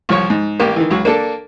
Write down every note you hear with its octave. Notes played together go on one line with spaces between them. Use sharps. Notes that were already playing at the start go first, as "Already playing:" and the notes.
C2 F3 C#5 C#6
G#2
A1 A#3 G4
D#3 E3
C#2 F#3
A#3 D4 A4